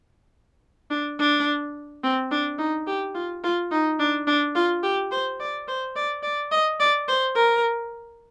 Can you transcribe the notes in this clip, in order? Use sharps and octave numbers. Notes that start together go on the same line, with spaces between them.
D4
D4
C4
D4
D#4
G4
F4
F4
D#4
D4
D4
F4
G4
C5
D5
C5
D5
D5
D#5
D5
C5
A#4